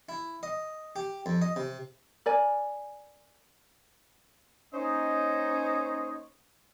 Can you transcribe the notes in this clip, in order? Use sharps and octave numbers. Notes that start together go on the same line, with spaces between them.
E4
D#5
G4
F2
D#5
C3
A#4 D5 G#5
A#3 C#4 D#4 C5 C#5 D#5